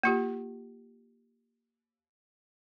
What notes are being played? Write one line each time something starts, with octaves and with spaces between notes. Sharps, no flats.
A#3 F4 G4